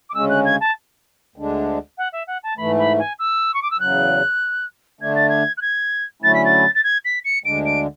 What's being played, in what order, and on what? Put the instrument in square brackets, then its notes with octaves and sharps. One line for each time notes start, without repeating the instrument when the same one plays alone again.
[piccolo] D6
[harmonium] D2 C#3 G#3 C#4 [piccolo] E6
[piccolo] F#6
G#6
A5
[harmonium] D2 D3 G#3 D4
[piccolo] F#5
E5
F#5
A5
[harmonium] G#2 E3 A3 [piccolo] B5
[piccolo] B5
G#5
E6
C#6
D6
E6
[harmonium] E2 C#3 F#3 [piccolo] F#6
[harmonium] D3 A3 D4 [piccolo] G#6
[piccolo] A6
G#6
F#6
G#6
[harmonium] D3 F#3 A3 C#4 E4 [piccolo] A6
[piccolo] B6
A6
A6
G#6
B6
C#7
[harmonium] D2 D3 G#3 D4 [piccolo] D7
[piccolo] D7